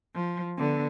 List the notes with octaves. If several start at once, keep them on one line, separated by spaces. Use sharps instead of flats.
F3
D3 B3